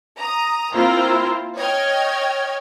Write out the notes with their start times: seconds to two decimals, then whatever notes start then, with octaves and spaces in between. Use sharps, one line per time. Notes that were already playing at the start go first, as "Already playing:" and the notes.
0.18 A#5 D#6
0.73 A#3 C4 E4 F4 A#4 C5
1.57 C#5 D#5 G5 F6 G#6